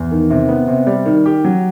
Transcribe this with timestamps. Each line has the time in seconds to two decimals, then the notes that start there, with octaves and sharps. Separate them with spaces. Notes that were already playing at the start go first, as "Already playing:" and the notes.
Already playing: E2
0.11 D#3
0.30 C3
0.49 B3
0.68 C3
0.87 G3
1.06 D#3
1.26 G4
1.45 F#3